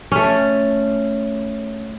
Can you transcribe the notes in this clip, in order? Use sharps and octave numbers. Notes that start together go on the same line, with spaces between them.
A3 C#4